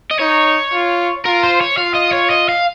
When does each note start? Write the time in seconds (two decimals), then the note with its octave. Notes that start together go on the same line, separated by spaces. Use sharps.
0.11 D#5
0.20 D#4 C#5
0.73 F4
1.25 F4 A#4
1.43 C5
1.61 C#5
1.77 F4 F5
1.95 D#5
2.13 C#5
2.31 D#5
2.49 F5